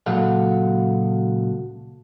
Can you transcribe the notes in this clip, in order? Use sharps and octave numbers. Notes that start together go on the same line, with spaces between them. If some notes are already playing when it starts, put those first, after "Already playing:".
C#2 A#2 F#3 A4 F5 F#5